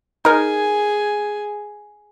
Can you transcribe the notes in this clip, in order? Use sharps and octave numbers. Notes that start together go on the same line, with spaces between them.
D#4 G#4 A#4 G#5